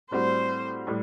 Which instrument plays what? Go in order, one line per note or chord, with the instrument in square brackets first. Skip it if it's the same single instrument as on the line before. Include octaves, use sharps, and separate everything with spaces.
[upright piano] A2 G3 C4 F#4 [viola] C5
[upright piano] A2 G3